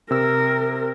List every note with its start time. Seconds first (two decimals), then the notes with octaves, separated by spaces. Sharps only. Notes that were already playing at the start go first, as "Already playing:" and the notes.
0.11 C3 A#4 E6